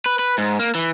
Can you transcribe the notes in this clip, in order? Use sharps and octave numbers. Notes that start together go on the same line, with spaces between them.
B4
B4
G#2
A#3
E3